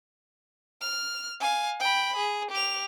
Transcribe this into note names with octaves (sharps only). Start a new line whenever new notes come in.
F6
F5 G#5
G5 B5
G#4
G4 F7